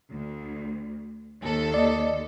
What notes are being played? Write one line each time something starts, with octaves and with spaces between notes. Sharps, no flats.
D2
D#2 A4
D5 D#5